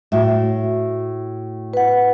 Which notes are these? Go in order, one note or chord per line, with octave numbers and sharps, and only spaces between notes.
A2 F#4 E5
B4 F#5